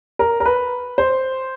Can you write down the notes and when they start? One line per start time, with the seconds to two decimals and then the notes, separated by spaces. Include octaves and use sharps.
0.19 A#4
0.40 A#4
0.46 B4
0.98 C5